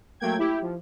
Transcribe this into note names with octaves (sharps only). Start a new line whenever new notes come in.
F#3 A3 A#3 G5 G#6
E4 G4
F3